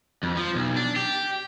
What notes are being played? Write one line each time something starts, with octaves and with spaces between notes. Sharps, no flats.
F2
F3
B1
D4
G4